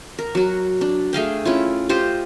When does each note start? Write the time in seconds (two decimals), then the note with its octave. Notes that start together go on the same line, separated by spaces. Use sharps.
0.19 A#4
0.35 F#3 F#4
0.81 D4
1.13 A3 G#4 F5 G5
1.45 C#4 E4 F4
1.89 F4 G4 C5 D#5